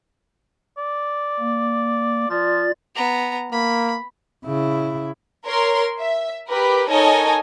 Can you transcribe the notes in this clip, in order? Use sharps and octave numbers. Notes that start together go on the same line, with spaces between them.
D5
A#3
F3 F4 D5 A6
B3 A#5
A#3 B5
C#3 E4
A#4 C#5 C6
E5
G4 A#4 B4
D#4 A4 A#4 C#5 D#5 G#5